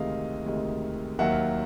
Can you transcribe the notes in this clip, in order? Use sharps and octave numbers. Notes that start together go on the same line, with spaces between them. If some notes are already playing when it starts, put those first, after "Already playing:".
Already playing: D2 C3 D#3 G#3 D#5 F5
D2 C3 D#3 G#3
D#2 D#3 F#3 A#3 E5 F#5